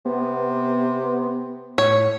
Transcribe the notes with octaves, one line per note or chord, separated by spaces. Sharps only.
C3 B3
A2 C#5